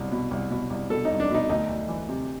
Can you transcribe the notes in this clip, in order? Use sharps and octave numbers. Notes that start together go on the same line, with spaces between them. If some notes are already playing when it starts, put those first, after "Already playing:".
Already playing: C2 B2
B2
C2
B2
C2
B2 A4
D#4
C2
D4
B2 D#4
D2 D#4
D2
E3
C3